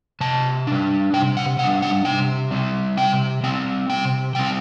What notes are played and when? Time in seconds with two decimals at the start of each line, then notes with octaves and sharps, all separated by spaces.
0.21 C3 A5
0.67 G3 D4
1.14 C3 G5
1.37 F#5
1.59 G3 D4 F#5
1.82 F#5
2.05 C3 G5
2.51 G3 C4
2.97 C3 G5
3.43 G3 C4 G5
3.89 C3 G5
4.35 G3 C4 G5